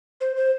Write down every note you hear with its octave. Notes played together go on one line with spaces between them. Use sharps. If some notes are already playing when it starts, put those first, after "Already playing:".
C5
C5